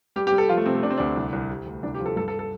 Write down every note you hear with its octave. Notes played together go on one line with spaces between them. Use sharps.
G3 G4
G4
G3
A4
F3 F4
A3
C3 C4
A3
C3 D4
C4
D2 D4
C2
C2
C3
D2
C2 D4
G4
F3
A4
G2 A4
A4
A4